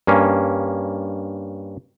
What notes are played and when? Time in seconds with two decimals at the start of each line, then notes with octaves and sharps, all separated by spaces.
0.07 G2 A#3 C#4